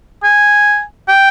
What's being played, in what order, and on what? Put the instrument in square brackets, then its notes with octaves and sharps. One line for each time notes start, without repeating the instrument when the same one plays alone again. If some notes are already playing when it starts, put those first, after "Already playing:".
[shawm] G#5
G5